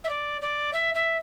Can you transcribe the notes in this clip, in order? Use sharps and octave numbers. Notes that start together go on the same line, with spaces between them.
E5
D5
D5
E5
E5